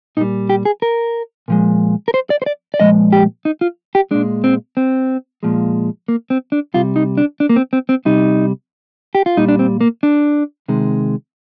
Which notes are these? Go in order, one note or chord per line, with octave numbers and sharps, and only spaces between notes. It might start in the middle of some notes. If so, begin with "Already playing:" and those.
A#2 G3 D#4
G4
G#4
A#4
A#2 F3 G#3
A#4
C5
D5
C5
D5
D5
A#2 F3 G#3 D#5
G4
D#4
F4
G4
A#2 G#3 D4
C4
C4
A#2 F3 G#3
A#3
C4
D4
C3 G3 F4
D#4
D4
D4
A#3
C4
C4
C4
C3 G3 D#4
G4
F4
A#2 G3 D#4
D4
C4
A#3
D4
C3 D#3 G#3